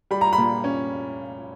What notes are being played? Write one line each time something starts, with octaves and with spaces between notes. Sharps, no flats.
G3 B5
A#5
B5
A#2
C#4